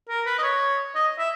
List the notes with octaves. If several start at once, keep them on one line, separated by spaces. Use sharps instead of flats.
A#4
B4
D#5
C#5
D#5
E5